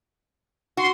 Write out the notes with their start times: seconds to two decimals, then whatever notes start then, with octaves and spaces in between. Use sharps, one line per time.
0.77 F#4 C6